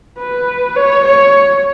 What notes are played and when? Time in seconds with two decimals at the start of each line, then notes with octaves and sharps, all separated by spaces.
0.18 B4
0.76 C#5
1.05 C#5